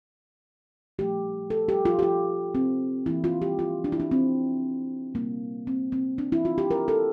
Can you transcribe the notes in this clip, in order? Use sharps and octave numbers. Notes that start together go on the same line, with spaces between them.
A#2 F3 A3 G4
A4
G4
F4
G4
F4
C4
E3 A#3 E4
F4
G4
F4
D4
E4
D4
C4
C3 G3 A#3
C4
C4
D4
E4
F4
G4
A#4
A4